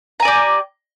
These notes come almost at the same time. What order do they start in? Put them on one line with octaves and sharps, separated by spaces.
A#5 G#5 D5 G4